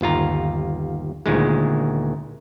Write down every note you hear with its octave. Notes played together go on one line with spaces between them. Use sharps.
G1 D#2 F4 A#5
D2 A#2 D#3 G#3